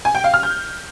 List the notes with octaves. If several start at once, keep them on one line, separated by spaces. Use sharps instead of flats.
G#5
G5
F5
F6
G6